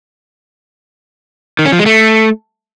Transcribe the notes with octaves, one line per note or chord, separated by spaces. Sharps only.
D#3
C#4
F3
G#3
A3